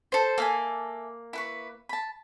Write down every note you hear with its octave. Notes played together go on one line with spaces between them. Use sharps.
A4 C5
A#3 A4 E5 G#5
E4 B4 C#6
A5 B5